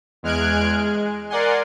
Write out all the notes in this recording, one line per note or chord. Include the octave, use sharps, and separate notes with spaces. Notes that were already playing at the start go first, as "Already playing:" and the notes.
E2 G#3 F6 F#6 G#6 D7
G#3
A#4 D5 F#5 G#5 C6